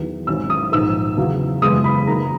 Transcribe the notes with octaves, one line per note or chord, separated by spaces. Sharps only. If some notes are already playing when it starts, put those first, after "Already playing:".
Already playing: E2 D#3 F#3
G#1 G#2 F#3 C#4 E6
D#6
A#1 G#2 D#3 E6
E2 C#3 F#3
F#1 E2 C#3 E3 G#3 D#6
B5
F#2 E3 A#3 D#4 A#5